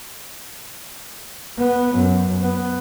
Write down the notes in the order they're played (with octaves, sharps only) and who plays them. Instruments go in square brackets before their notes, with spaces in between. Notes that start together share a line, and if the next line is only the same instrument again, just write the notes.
[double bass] B3
F#2
B3